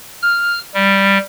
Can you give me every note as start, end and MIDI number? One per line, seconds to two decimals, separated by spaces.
0.23 0.59 89
0.74 1.18 55